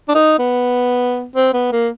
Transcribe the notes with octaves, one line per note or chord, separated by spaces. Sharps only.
D4
D#4
B3
C4
B3
A#3